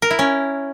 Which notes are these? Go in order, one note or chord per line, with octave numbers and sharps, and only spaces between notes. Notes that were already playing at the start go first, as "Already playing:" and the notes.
A#4
E4
C#4